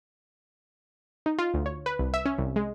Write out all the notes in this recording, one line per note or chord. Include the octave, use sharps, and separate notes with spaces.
D#4
F4
D2
C#5
B4
C2
E5
C#4
C2
G#3